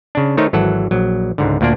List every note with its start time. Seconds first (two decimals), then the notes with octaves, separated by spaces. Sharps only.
0.15 C#3 D4
0.37 D#3 A3 D#4 C5 C#5
0.53 G#1 E3 F#3 A4 F#5
0.91 A#1 F#3
1.38 C#2 G#2 D3
1.61 D2 A#2 A#3 D4 D5